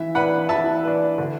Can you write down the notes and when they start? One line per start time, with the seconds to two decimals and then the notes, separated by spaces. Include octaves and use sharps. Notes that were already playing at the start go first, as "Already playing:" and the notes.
Already playing: E3 E5
0.15 D4 B4 F#5 B5
0.49 E3 E5 A5
0.84 D4 B4
1.18 D3